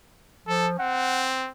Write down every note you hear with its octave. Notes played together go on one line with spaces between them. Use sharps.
F3 A4
C4 F#5